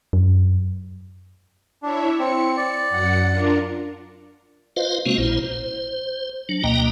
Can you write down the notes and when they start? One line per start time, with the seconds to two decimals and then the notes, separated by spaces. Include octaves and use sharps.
0.13 F#2
1.83 D4 E4 C#5 E5
2.19 C4 C#7
2.57 D5
2.90 F#2 F#5 C#7
3.30 D4 F4 A#4
4.76 F4 B4 C5 D#5 F5
5.06 C3 G#3 A#3 C4 C#4 F#4
5.18 A#1 A#2 E4 C5
5.43 C5
6.49 F#3 D4
6.63 D2 B2 A#3 D#5 G5 A#5